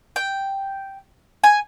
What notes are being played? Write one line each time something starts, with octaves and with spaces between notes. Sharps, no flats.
G5
G#5